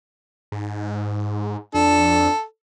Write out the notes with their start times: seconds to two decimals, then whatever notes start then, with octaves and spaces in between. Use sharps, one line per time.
0.52 G#2
1.74 F2 D4 A4